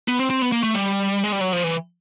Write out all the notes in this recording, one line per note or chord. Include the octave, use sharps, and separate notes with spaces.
B3
C4
C4
B3
A#3
A3
G3
G#3
G3
F#3
F3
E3